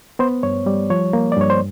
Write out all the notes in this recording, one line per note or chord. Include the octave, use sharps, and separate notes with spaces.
B3 C5
G2 C#5
G3 D5
F3 C#5
A#3
D5
G2 C#5
C5